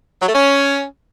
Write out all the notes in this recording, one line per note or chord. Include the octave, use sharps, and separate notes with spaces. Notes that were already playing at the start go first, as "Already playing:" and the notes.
F#3
A3
C#4